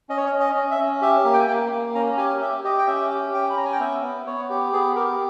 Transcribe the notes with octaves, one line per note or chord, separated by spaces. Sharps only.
C#4 D#5
C#5
D#5
C#4
D#5
C#4
E5
C#4
G4 E5
A#3
G5
G#5
A#3 G5
A#3
C#4 A#5
G4 G#5
G4 E5
G4 D#5
G5
C#4 E5
G4
C#4 G5
B5
C#4 A#5
G#5
G5
B3 E5
B3
B3 C#5
G4
B3 G#4
G4 A#4